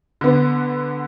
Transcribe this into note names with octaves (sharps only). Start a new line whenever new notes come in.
D3 B3